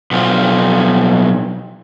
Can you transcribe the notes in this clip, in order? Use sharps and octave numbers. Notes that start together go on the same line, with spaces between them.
B1 F3